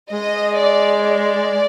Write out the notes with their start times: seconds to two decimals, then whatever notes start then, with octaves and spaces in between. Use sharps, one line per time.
0.11 G#3 D#5
0.57 D5
1.02 D5